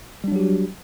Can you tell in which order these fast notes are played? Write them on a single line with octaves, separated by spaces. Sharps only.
G3 D4 F#3 G4 F#4